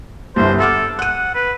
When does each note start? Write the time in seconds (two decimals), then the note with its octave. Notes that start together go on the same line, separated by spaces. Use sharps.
0.36 G1 C2 C5
0.60 A4 F#5 D6 F6
0.99 F#5 F#6 D#7
1.35 B4